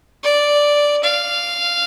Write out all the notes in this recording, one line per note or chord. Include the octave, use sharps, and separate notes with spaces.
D5
F5